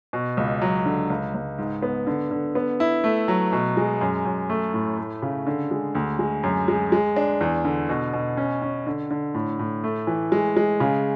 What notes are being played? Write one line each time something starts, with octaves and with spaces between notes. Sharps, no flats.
B2
C#2
F#3
D3
C#2
C#2
G#2
B3
D3
D3
B3
E4
A3
F#3
B2
G#3
F#2
F#2
A3
A2
A3
C#3
D3
G#3
D2
G#3
F#2
G#3
G#3
D4
E2
D3
B2
B2
C#4
C#4
D3
D3
A2
A2
A3
E3
G#3
G#3
C#3